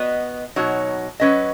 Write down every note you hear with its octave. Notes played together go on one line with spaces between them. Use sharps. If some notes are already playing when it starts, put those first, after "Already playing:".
Already playing: B3 F#4 D#5
B2 F#3 D#4 F#4 C#5
F#3 C#4 B4 D#5